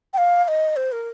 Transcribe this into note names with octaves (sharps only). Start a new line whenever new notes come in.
G5
F5
F5
D#5
C5
A#4